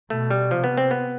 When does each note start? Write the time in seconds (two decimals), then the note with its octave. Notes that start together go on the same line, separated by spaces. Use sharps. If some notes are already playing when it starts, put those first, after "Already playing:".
0.10 B2 A3
0.31 G3
0.50 C3 F3
0.64 B3
0.77 C4
0.91 B3